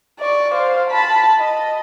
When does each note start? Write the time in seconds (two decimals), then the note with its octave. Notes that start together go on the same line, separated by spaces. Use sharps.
0.20 D5 C#6
0.54 C5 F5
0.91 A5 B5
1.39 D#5